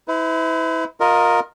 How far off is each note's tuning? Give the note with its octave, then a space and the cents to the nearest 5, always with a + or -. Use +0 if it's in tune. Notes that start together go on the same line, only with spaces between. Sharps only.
E4 -25 B4 +45
F4 +25 A#4 +0 D#5 +0